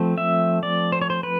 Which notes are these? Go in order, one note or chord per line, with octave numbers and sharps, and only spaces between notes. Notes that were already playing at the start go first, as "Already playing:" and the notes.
Already playing: F3 A3 C4
E5
D5
C5
C#5
C5
B4